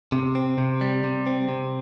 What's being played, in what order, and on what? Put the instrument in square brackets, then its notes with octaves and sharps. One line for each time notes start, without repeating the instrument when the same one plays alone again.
[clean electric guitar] C3
C4
C3
G3
C3
C4
C3